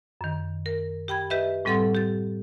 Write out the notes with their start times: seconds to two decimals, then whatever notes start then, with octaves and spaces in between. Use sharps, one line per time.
0.21 F#2 D#3
0.66 A#4
1.08 G4 G5 B5 G#6
1.30 G4 B4 D#5 E5
1.65 A2 G3 C4 A4 F#5 C6
1.95 G4 A6